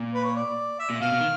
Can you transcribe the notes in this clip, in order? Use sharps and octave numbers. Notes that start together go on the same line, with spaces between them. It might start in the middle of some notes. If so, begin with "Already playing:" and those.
Already playing: A#2
B4
C#5
D5
E5
A#2
B2 F5
B2
D#3